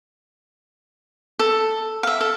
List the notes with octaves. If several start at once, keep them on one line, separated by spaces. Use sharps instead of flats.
A4
E5 F5
A4